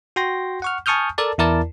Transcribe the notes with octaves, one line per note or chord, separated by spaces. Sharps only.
F#4 G5 C6 A#6
F#5 C#6 F6
G#5 A5 C#6 D#6 F6 G6
A4 A#4 D5 A5
E2 E4 A#4 D5 A5